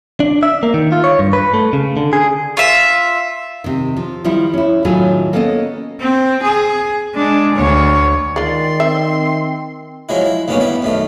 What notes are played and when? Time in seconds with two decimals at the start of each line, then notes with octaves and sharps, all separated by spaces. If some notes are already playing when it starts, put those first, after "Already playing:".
0.20 D4
0.43 E5
0.63 A#3
0.74 D#3
0.92 F4
1.04 C#5
1.19 G2
1.33 B4
1.54 A3
1.73 C#3
1.97 D3
2.13 G#4
2.57 F4 E5
3.64 C3 D#3
3.97 F3
4.24 D#3 F3 G3 D#4 E4
4.53 C#4 E4
4.85 A2 D#3 F#3 F4 G#4
5.33 A#3 B3 C#4 A4 D5 D#5
6.00 C4
6.43 G#4
7.15 G#3 D4
7.56 D2 C#5
8.36 D#3 G#3 F4 D5 C6
8.80 C4 E5
10.09 F3 F#3 G#3 E4
10.26 E4
10.48 D2 G2 D#3 A#3 B3 C#4
10.60 G3 B3 E4
10.82 F#2 D#3 A3